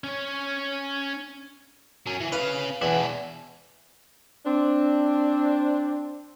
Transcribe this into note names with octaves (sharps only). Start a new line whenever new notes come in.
C#4 C#5
F#3 C#4
E3
C#4 B4 F5
E2 B2 E4
C4 D4